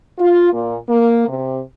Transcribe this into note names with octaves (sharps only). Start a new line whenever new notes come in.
F4
A#2
A#3
C3